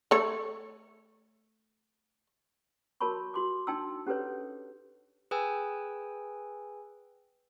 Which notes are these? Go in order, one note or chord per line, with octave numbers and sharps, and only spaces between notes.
A3 C#5
F#4 A#4 C#5 A5 B5 C#6
F#4 C6 D6
D4 D#4 G5 A5 C6 E6
C#4 G4 A4 B4 C#5
G#4 B4 G5 G#5 E6